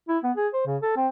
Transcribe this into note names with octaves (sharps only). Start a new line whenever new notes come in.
E4
B3
G#4
C5
C#3
A4
C4